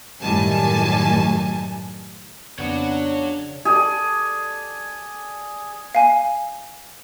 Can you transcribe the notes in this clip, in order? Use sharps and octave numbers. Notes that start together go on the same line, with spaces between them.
F#2 A2 D#3 G3 G#5 A5
F2 C#3 B3 D4 C#5 D5 F#5
G#4 A4 D5
F5 G#5